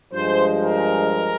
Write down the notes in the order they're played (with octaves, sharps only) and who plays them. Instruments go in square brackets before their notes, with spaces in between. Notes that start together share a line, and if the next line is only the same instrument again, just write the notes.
[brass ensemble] G2 F3 G#3 C5
A#4